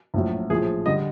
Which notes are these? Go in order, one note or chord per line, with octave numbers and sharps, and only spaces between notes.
A#1 A2 F#3
A#1 A2 F3 G#4
D3 G3 D#5